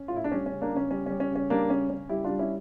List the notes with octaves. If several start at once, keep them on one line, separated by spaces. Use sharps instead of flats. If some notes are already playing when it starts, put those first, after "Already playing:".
Already playing: C#4
F4
A2 E4
D4
G3 C#4
C#4
C#3
A#3 D4
C#3
C#4
G3 C#4
G3 C#4
C#4
C#3
C#4
G3 A#3 D4
C#3 C#4
C#3 C#4
G3 E4 G4
G3 D4 F4
C#4 E4